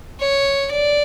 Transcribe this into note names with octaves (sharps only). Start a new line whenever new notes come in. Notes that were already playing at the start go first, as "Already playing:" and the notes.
C#5
D5